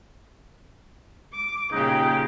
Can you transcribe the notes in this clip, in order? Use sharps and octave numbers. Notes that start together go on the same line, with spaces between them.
D6
A#2 C#3 D#4 G4